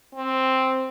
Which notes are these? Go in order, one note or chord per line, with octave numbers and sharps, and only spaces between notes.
C4